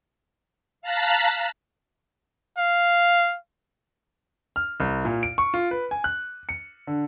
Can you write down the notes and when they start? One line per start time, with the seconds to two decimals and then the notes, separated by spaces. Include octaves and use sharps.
0.82 F5 A5 A#5 F#6 B6
2.58 F5
4.56 F6
4.80 C2
5.05 A#2
5.23 D7
5.38 C#6
5.54 F4
5.71 B4
5.91 G#5
6.04 F#6
6.49 C#7
6.87 D3